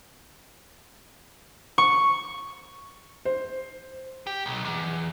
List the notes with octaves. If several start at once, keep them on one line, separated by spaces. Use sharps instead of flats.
C#6
C5
G4
B1
E2